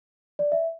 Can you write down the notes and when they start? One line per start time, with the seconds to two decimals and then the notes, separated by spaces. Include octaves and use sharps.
0.39 D5
0.52 E5